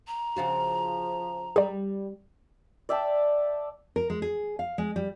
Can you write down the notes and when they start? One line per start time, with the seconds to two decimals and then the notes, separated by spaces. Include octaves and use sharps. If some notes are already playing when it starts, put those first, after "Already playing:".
0.07 A#5
0.36 C#3 F3 F4 F#4
1.56 G3 G#4 D5
2.89 D5 E5 G5 A5
3.96 A#4
4.10 G#3
4.22 G#4
4.59 F5
4.78 G#3
4.96 G3